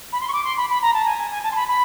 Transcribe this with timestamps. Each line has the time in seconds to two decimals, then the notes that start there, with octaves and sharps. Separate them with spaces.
0.13 B5
0.21 C6
0.28 C#6
0.33 D6
0.44 C6
0.57 B5
0.70 B5
0.82 A#5
0.94 A5
1.06 G#5
1.19 G#5
1.31 G#5
1.43 A5
1.52 C6
1.56 B5
1.68 B5